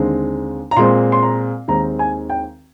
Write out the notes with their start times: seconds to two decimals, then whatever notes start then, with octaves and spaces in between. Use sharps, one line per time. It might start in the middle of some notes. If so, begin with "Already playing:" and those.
Already playing: D#2 D3 G#3 C4
0.71 A#5
0.76 A#2 G#3 C4 C6
1.12 C6
1.22 A#5
1.68 D#2 D#3 G#3 C4 A#5
1.99 G#5
2.30 G5